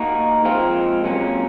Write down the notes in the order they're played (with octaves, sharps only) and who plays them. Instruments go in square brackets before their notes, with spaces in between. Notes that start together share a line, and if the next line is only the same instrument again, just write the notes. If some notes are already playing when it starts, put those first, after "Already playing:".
Already playing: [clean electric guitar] A#3 D#4 F#4
F3 G#3 C4 F4
C3 F#3 A#3 C#4